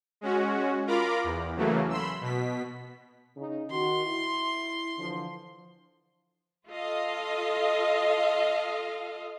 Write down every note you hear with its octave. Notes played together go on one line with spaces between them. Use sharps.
G#3 C#4 F#4
F4 A#4 A#5 B5 D6
E2
C#3 E3 F#3 A3 A#3
B5 C6 E6
B2 B6
C#3 D#4
D#3 F#4 C6
E4
D3 E3 F3
F4 A4 D#5 F5